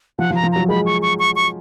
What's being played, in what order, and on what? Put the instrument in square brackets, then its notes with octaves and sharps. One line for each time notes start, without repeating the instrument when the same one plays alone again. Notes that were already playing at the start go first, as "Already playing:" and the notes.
[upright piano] F3 [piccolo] F#5
[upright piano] F3
[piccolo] A#5
[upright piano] F3
[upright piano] F#3 [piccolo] A#5
[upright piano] G#3 [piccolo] B5
[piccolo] C#6
C#6
C#6
C#6